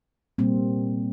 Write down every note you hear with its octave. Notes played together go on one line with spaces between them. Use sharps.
A#2 G3 A#3 C4